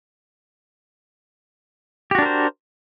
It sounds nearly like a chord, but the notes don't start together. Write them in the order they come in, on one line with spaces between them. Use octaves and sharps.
G4 F#4 D4 A#4 C5